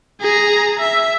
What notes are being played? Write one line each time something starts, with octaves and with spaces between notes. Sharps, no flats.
G#4 A#5
E5